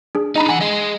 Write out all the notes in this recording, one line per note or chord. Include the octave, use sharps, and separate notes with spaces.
D4 G#4
D4 D#4 D#5 A#5 B5
E3 F#5 G#5
G#4 D#5